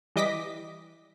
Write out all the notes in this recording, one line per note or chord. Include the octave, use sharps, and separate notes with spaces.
E3 G3 D#5 D6 A#6 B6